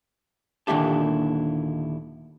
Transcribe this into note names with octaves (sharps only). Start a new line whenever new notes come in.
D#2 A#2 D3 E4 G4 A5